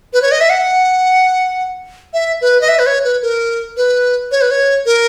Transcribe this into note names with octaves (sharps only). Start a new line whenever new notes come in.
B4
C#5
D#5
E5
F#5
E5
B4
D#5
E5
B4
C#5
B4
A#4
B4
C#5
B4
C#5
A#4